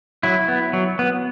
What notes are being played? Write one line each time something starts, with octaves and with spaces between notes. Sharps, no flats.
F#3 E4
B3
F#3
B3